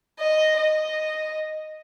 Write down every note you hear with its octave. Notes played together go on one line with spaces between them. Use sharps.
D#5
D#5